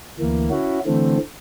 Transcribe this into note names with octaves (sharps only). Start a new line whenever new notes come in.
D2 E3 A#3
C#4 E4 F#4
D3 E3 A3 C4